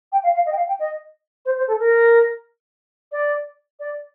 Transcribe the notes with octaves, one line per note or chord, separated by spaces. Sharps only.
G5
F5
F5
D#5
G5
F5
G5
D#5
C5
C5
A4
A#4
D5
D5